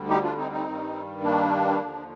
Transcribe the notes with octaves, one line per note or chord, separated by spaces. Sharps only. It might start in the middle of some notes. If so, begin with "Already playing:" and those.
Already playing: D2 D3 G3
D#4 G4
D4 F4
C4 D#4
C4 D#4
G2 D#3 G3
A#3 D4
D#2 D3 F3